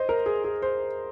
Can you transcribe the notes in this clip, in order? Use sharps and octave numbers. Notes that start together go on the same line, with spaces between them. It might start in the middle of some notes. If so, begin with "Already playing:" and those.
Already playing: C5 D#5
A#4
G#4
G#4
C5